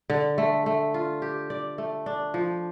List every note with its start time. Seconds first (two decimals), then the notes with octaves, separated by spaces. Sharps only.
0.10 D3
0.38 A3
0.66 A3
0.94 F4
1.22 G4
1.50 D5
1.78 A3
2.06 D4
2.34 F3